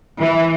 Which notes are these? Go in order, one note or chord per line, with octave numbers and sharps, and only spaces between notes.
E3